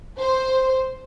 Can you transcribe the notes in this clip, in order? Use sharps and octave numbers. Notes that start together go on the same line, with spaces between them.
C5